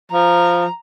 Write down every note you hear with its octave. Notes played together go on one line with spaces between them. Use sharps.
F3 A#5